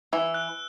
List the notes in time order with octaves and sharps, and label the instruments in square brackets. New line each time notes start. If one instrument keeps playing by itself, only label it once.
[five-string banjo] E3 [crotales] E6
[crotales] F#6